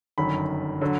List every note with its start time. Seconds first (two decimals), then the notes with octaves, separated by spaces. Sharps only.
0.18 G1 F#2 D#3 B5
0.81 D3 F#3